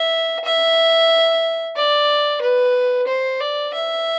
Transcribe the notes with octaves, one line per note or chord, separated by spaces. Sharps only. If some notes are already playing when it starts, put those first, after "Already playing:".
Already playing: E5
E5
D5
B4
C5
D5
E5